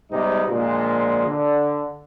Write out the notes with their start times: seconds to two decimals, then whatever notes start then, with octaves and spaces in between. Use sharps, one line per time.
0.12 G#2 C3 G3 B3 D#4
0.48 A#2 D3 F3 G#3 F4
1.27 D3